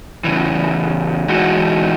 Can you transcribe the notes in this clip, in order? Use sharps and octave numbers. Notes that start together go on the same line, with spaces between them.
E2 C#3 E3
E3 G#3 D#4 F#4